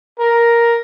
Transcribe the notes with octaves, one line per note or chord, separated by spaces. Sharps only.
A#4